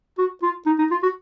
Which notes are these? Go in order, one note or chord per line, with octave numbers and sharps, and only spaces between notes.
F#4
F4
D#4
D#4
F4
F#4